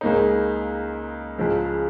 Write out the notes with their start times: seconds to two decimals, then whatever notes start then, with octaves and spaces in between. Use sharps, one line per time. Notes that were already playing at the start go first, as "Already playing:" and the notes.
0.01 C#2 C#3 A#3 D#4
1.38 C#2 C#3 F3 G#3